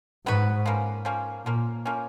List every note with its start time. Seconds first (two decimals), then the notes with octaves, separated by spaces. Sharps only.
0.26 G#2 F#3 B3 F#4 B4
0.66 F3 A#3 C#4
1.05 F3 A#3 C#4
1.45 A#2 F3 A#3 C#4
1.85 F3 A#3 C#4